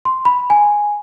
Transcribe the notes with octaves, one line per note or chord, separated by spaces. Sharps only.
C6
B5
G#5